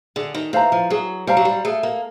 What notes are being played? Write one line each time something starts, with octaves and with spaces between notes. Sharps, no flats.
D3 G#4
D#3
E3 C5 F5 A#5
F3
F#3 G#4
G3 C5 F5 A#5
F#3
G3
A3 G#4
A#3